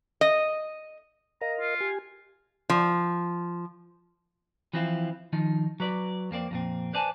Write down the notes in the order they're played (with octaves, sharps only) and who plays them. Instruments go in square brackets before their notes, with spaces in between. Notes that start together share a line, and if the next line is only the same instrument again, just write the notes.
[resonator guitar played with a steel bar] D#5
[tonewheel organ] A#4 D#5 F5 [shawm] A#5
[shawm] F4
[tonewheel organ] G4 G#5
[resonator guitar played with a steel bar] F3
[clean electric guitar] E3 F3 C4 E4 F4
D#3 F3 D#4
F#3 B4 D5
F2 A#3 C4 D5
F2 A#2 C4
B4 C5 D5 G#5 A5